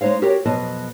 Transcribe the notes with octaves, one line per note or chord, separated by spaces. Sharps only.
G#3 D#4 C5 C#5 F5
F#4 G4 A#4 C#5 G5
F2 B2 F#3 B3 D#5 A5